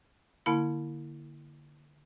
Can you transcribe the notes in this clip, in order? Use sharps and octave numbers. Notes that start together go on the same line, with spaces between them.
D3 A#3 E4 B5